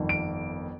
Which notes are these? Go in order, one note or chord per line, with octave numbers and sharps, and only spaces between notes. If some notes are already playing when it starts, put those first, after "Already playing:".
Already playing: G1 F2 D#3
D7